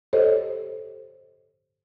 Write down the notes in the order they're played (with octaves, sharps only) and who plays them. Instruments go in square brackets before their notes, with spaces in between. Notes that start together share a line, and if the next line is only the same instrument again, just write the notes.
[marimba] G4 A4 C5 C#5 D#5